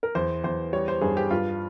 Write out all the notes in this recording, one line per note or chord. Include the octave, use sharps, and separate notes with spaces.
A#4
E2 C5
E2 C5
G3 C#5
C5
G2 G#4
G4
G2 F4